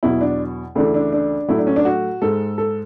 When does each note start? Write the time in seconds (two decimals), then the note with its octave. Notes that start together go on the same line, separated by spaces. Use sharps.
0.03 E2 B2 F#3 E4
0.21 D4
0.75 D2 C#3 E3 A3 D4
0.94 D4
1.12 D4
1.48 A2 F#3 A3 E4
1.58 D4
1.67 C#4
1.76 D4
1.85 F#4
2.22 G#2 G#3 A4
2.58 A4